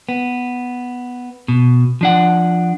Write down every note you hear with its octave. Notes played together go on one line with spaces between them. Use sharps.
B3
B2
F3 D4 F#5